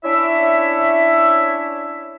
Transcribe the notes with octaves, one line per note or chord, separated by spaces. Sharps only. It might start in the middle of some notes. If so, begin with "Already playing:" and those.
C#4 D4 E4 C#5 E5